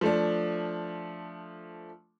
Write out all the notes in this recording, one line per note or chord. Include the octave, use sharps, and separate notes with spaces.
F3 A3 D4